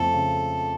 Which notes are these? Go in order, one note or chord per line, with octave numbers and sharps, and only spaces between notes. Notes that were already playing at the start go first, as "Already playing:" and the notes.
Already playing: F2 C#3 F3 A3 A4
C#3